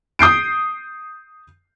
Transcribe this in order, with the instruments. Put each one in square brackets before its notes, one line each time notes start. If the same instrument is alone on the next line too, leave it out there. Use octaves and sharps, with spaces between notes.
[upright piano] D#6 G6 C7 D7